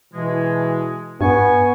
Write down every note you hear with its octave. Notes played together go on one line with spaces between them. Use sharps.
B2 E3 G#3
G2 B3 G#5 C#6